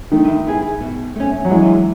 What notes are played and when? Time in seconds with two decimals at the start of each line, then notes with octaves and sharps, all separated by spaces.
0.12 D#3 A3
0.47 E4 G#4 B4
0.81 B2
1.15 A3 C#4
1.45 F#3
1.50 E3 G#3